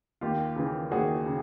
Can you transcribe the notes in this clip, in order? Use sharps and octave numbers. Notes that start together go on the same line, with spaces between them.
D#2 F4 G4
C#3 E3
D#2 F#4 G#4
C#3